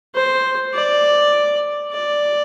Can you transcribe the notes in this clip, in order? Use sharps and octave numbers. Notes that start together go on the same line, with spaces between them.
C5
D5
D5